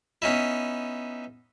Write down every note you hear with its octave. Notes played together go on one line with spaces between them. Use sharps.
B3 C#4 D#4 E4